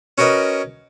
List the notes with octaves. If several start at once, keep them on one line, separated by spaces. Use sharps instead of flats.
C#4 F#4 A#4 B4 D#5